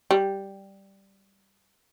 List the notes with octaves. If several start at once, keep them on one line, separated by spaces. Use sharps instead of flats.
G3